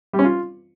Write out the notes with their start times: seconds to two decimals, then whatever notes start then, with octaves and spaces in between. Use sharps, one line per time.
0.13 G3
0.19 C#4
0.24 F4